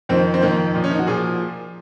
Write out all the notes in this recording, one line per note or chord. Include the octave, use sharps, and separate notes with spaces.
F2 D#3 C4
C4
F2 D#3 A#3
A#2 F3
C#4
D#4
F#4
A#2 F3 G#4